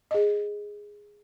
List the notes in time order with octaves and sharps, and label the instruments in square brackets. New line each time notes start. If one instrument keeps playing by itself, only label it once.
[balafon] G#4 D#5